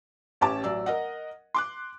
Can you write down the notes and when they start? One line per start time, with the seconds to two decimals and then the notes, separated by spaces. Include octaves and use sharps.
0.41 A1 C#4 G4 A5 D6
0.64 A1 F#3 D5 E6
0.86 A#4 D#5 F#5
1.55 C6 D6 F#6